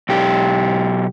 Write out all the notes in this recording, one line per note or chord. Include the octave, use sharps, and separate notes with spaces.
B1 G4